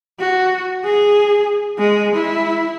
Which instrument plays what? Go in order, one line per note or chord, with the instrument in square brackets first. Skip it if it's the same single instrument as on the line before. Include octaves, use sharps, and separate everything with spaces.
[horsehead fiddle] F#4
G#4
G#3
E4